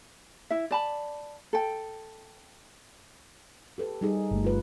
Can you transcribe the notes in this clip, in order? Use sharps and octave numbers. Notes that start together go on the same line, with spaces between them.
E4 E5
D5 A5 B5
A4 G5
G4 A4 B4
G3 D#4 G#4
G1 A3
F4 B4